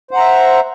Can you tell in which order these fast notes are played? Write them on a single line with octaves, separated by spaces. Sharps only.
C5 F#5 A#5 E5